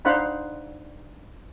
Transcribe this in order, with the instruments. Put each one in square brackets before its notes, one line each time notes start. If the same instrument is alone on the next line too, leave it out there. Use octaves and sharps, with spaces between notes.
[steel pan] D4 D#4 C5 F5 F#5 B5